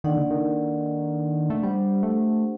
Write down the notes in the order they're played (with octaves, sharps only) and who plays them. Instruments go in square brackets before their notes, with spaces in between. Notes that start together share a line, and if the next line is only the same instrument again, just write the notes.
[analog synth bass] D#3 [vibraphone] A#3 D4 A4 D5 F#5
[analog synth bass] D3
D#3
A3
[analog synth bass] G3 [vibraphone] D4 G4 C5 F#5
[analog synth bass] A3